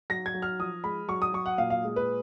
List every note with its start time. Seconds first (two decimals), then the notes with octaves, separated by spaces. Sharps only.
0.10 F#3 A#6
0.26 G#6
0.34 F#3
0.42 F6
0.59 F3 D#6
0.84 G#3 B5
1.08 F#3 C#6
1.22 D#6
1.33 F#3 C#6
1.46 F#5
1.58 A#2 F5
1.70 F5
1.84 G#3
1.96 B4